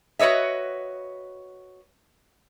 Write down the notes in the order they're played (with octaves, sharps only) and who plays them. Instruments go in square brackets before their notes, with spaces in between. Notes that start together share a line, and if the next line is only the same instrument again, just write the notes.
[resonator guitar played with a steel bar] F#4 B4 C#5 D#5 E5